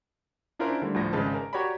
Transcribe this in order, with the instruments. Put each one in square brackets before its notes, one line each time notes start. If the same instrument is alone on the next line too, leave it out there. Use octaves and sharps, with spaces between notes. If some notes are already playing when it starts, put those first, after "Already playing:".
[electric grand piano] C#4 D4 E4 F4 A#4 C5
D3 G3 A3
D2 A2 F3 A#6
G#1 C#3 G#3 B4 A5
A#4
F#4 G4 C#5 D5 A#5 B5